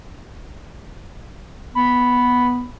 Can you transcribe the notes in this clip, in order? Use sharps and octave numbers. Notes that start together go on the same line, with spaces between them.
B3 B5